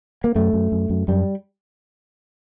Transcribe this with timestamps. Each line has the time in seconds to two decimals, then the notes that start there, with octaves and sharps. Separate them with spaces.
0.24 A#3
0.35 F#2 A3
0.53 F#2
0.72 F#2
0.90 F#2
1.08 F#2 G3